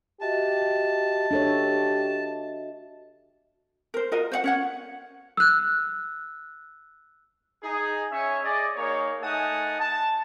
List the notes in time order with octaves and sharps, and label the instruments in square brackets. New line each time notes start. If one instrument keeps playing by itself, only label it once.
[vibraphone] F#4 D#5 E5 [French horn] G4 [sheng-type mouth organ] A5
[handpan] D4 A4 C#5 [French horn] G4
[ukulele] A#4 C5
F4 F#4 A#4 D#5
C5 C#5 F#5
C#4 C#5 F#5
[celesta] E6 F#6
[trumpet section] D#4 G#4
C#4 C#5 E5 G#5
G#4 D5 D#5
A#3 D#4 G#4 C#5
A3 D#4 F#5 G#5 A5 D#6
A5